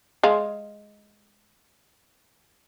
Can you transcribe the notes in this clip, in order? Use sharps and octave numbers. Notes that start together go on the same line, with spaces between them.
G#3 F5